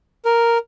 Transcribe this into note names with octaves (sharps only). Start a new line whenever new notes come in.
A#4